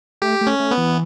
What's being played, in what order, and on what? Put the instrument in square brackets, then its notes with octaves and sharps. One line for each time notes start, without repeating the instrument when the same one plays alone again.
[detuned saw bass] A3 [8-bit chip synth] G4
[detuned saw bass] A3
[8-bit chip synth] C#4
[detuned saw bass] A3
[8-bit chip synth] B3
[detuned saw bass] E3